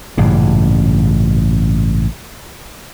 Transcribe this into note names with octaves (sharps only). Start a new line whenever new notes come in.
A1 G2 A#2 C#3